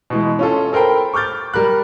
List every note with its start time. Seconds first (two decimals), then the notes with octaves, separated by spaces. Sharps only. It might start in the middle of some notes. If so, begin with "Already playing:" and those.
0.10 B2 E3 G#3
0.39 C#4 F4 A4
0.73 A4 A#4 C5 G5 B5
1.14 C#6 D6 F6 G6 A6
1.54 G3 A#4 B5 F#6